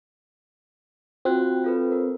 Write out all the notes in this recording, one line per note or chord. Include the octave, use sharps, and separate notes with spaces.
C4 F4 F#4 F#6
F4 A4 B4
A#4